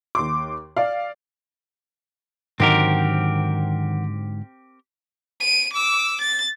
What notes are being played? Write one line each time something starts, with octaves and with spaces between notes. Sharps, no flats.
D#2 C6 D6
D5 F5
G#2 D3 D#3 F#3 C4 G4 A#4 F#5
D7 D#7
D6 E6
A6